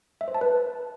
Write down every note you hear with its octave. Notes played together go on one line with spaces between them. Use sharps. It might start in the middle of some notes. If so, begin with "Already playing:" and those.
E5
C5
A5
B4